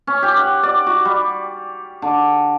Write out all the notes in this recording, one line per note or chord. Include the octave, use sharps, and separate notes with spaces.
C#4
G4
F#5
D5
F#4
G3
D3